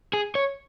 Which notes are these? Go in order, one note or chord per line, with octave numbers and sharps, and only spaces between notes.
G#4
C#5